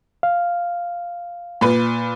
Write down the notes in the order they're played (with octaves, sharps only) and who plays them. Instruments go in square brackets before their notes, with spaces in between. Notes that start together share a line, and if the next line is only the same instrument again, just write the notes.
[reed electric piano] F5
[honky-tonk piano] A#2 B4